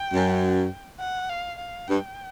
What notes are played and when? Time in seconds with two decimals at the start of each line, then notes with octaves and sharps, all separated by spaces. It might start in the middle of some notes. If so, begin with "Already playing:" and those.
Already playing: G5
0.13 F#2
1.00 F#5
1.29 F5
1.58 F5
1.87 G2 G5